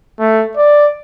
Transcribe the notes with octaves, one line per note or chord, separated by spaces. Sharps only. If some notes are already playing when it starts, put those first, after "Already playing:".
A3
D5